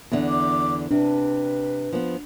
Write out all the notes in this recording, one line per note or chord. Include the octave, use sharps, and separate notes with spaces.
E2 D3
D6
C3 D4 B4
F3 B3